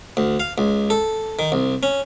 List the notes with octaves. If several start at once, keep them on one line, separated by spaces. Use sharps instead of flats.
D2
F5
C#2
A4
D#3
C2
C#4